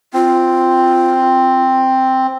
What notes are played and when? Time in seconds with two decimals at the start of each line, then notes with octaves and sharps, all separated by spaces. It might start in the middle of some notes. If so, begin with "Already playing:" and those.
0.14 C4 F4